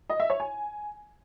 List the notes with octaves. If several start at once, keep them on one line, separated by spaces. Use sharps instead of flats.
D#5
E5
C#5
G#5